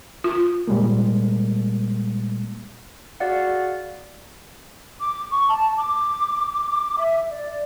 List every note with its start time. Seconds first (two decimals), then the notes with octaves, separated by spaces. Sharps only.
0.24 F4
0.67 A#2 G3 G#3 A#3
3.20 F#4 G#4 D5 F5 F#5
5.00 D6
5.30 C#6
5.48 A5
5.77 D6
6.96 E5
7.29 D5